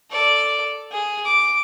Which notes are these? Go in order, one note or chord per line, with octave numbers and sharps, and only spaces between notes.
A4 D5
G#4
D6